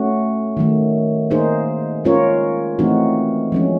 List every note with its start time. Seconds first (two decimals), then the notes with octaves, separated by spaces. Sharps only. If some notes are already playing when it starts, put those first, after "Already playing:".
Already playing: A3 C#4 F#4
0.57 D#3 F#3 A3
1.31 A#3 D#4 G#4 C5
2.04 G#3 C#4 F4 A#4 C#5
2.79 E3 A3 C4 D#4 F#4
3.52 F3 G#3 C#4